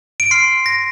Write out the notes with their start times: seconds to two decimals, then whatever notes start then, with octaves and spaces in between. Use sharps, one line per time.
0.20 D7
0.31 C6 F6 C7
0.66 A#6